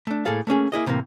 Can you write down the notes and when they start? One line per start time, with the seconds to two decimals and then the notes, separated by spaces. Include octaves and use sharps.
0.07 A3 D4
0.25 A2 A#3 G#4 A4 F5
0.47 A3 A#3 C#4 G#4
0.72 A#3 E4 G#4 D#5
0.86 A2 C3 E3 G#3 A#3